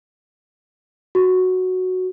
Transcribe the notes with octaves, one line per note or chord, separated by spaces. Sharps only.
F#4